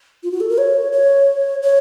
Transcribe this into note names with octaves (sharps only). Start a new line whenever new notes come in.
F4
F#4
A4
A#4
C#5
C#5
C#5